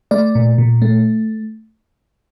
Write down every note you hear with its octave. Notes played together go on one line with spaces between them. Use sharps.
A3 D5
A#2
A#2
A3